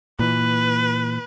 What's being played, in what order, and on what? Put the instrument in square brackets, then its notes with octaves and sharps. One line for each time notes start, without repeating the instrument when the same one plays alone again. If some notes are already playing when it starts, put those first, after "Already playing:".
[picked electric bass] A#2 E3 [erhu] B4